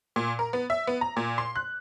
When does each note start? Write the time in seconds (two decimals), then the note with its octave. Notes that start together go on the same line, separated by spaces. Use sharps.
0.16 A#2
0.39 A#4
0.53 B3
0.70 E5
0.87 B3
1.01 A#5
1.17 A#2
1.38 C6
1.56 F#6